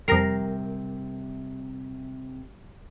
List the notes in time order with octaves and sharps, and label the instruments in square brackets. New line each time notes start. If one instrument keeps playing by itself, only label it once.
[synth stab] F2 A#5 C7 [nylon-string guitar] C3 [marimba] G3 G5 [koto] A#4